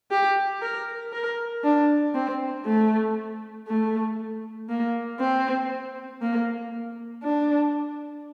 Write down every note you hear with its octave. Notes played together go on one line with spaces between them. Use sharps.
G4
A#4
A#4
D4
C4
A3
A3
A#3
C4
A#3
D4